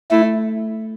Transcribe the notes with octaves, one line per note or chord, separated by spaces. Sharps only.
A3 E4